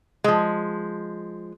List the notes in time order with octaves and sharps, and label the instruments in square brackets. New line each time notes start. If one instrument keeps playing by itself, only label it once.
[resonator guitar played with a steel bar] F3 G#3